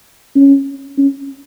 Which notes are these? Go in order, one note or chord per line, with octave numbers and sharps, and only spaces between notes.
C#4
C#4